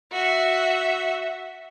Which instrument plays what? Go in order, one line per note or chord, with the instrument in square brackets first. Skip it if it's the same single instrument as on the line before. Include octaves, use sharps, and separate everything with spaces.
[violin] F#4 E5